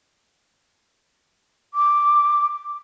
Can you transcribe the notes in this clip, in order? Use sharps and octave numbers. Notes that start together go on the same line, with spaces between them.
D6